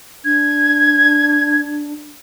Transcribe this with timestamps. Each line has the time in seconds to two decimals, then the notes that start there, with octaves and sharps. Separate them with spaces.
0.25 D4 G#6